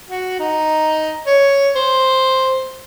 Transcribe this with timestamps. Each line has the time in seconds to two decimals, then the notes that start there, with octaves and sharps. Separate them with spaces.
0.10 F#4
0.40 D#4
1.27 C#5
1.75 C5